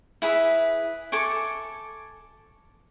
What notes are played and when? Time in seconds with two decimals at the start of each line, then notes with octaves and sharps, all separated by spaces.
0.22 E4 G#4 B4 E5
1.12 A4 G#5 C#6 D6